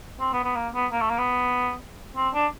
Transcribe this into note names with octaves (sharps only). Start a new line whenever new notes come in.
C4
B3
B3
A#3
B3
A#3
A3
A#3
B3
C4
D4